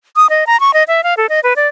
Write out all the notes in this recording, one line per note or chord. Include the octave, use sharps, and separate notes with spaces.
D#6
D#5
A#5
C#6
D#5
E5
F5
A4
D#5
B4
D5